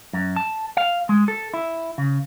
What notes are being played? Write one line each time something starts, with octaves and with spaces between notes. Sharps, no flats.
F#2
A5
F5
G#3
A4
E4
C#3